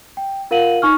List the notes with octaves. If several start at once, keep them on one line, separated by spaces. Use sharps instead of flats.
G5
F4 A#4 F5 F#5 D#7 F#7
D#4 C#6 F6